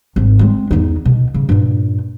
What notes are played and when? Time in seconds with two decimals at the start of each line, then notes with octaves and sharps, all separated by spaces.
0.16 G#1
0.39 G#3 C4
0.71 E2 D#4
1.05 B2
1.34 C#3
1.49 G2 A#2